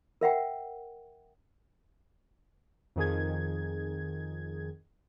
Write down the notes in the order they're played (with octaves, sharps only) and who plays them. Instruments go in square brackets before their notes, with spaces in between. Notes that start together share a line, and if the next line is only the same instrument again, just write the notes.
[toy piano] A#4 E5 F#5 G5
[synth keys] F2 D#3 G#4 G#6